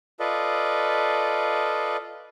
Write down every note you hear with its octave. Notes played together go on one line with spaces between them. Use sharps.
F4 A4 B4 D5 D#5